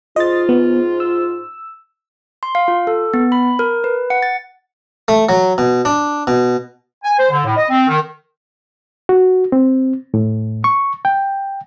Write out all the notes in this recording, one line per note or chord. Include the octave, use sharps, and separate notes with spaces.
G#2 F4 D#5 A6
B3
E6
C6
F5
F4
A4
B3
B5
A#4
B4
F#5
A6
A3
F#3
B2
D4
B2
G#5
C5
D3
A2
D#5
C4
D#3
F#4
C4
A2
C#6
G5